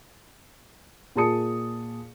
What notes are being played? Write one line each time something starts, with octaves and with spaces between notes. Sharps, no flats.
A#2 G#4 A5 D#6 C#7